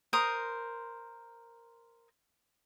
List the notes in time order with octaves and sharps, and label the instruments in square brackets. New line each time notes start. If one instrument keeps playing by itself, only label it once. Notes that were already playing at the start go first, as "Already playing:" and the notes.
[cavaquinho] A#4 C5 D#6